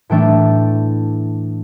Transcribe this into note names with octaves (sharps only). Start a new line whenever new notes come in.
A2 E3 A3 D4 G5